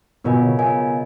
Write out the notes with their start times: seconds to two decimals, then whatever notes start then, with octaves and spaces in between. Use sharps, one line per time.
0.24 B2 B3 F4 A#4 D#5 G#5
0.42 C#3
0.59 B3 F4 A#4 D#5 G#5